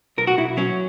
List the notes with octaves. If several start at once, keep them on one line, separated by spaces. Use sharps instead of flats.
B1 A#4
F#4
B1 E4
F#3 C#4